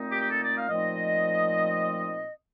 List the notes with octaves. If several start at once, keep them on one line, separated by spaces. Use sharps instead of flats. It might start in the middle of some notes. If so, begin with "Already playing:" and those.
Already playing: A#2 A3 C4 D#4
G4
G4
A4
D5
F5
A#2 F3 A3 C4 D#4 D#5